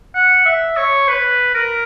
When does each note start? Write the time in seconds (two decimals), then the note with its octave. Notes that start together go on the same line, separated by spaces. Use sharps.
0.15 F#5
0.45 E5
0.77 C#5
1.08 B4
1.55 A#4